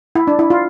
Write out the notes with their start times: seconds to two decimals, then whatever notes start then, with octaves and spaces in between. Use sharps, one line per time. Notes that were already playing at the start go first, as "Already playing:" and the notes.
0.15 E4
0.27 D4
0.39 E4
0.50 F4